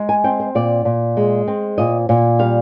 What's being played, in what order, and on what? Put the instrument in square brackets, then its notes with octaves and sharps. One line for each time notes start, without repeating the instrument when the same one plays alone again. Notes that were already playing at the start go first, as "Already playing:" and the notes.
Already playing: [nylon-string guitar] G#3
G#5
C4 G5
C5
A#2 D5
A#2
G#3
C4
A#2 D#5
A#2
G3 F5